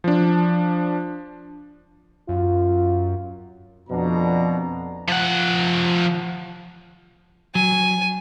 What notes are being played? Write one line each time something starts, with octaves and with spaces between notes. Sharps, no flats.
F3 D4
F#2 F4
F2 B2 D4 A#5
F3 F#5
F#3 G#5